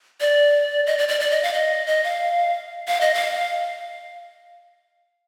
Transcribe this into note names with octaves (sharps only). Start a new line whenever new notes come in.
D5
D#5
D5
D5
D5
D#5
F5
D#5
D#5
F5
F5
D#5
F5